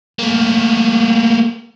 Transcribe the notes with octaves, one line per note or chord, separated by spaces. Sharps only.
A3 A#3